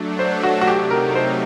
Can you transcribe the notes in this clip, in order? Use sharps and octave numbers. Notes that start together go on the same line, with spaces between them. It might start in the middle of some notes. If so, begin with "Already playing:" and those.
Already playing: F#3 A3 D4
C5
F#4
F#4
C3 F#3 A3 D#4 G4
A#4
C5